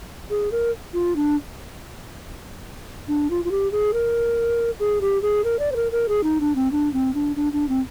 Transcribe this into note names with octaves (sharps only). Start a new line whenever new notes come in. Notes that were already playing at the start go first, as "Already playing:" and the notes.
G#4
A#4
F4
D4
D4
F4
F4
G4
G#4
A#4
G#4
G4
G#4
A#4
D5
C5
A#4
A#4
G#4
D#4
D4
C4
D4
C4
D4
D4
D4
C4